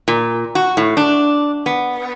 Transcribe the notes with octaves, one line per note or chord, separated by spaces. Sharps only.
A#2
F#4
A2
D4
B3